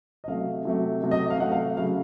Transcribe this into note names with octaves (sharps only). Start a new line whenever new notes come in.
D#5
C3 F#3 A3 F5
C3 F#3 A3
C3 F#3 A3
D#5
F5
C3 F#3 A3 F#5
F5
C#3 F#3 A3 F5